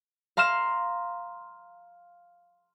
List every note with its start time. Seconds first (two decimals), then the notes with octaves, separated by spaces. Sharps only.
0.37 F5 A#5 C6 F6 E7